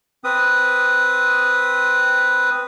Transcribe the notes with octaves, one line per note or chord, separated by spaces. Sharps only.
C4 B4 D#6